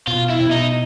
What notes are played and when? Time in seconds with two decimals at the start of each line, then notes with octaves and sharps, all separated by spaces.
0.08 B2 F4
0.30 E4
0.41 B2
0.51 D#4